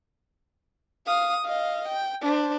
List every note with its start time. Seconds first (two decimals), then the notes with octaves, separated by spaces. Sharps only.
1.06 F5 D#6
1.46 D#5 F5
1.88 G5
2.22 D4 C5